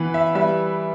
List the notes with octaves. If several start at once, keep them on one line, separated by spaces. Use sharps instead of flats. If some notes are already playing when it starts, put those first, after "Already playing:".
Already playing: E3 B3 B4
E5
G3 E5